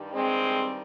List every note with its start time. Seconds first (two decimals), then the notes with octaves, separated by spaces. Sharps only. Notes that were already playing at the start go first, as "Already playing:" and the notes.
Already playing: G2 D#3 G3
0.13 G#3 C4